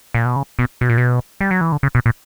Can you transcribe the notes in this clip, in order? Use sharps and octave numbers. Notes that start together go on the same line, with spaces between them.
A#2
B2
C#3
B2
B2
A#2
B2
G3
F#3
E3
D3
C#3
B2
A#2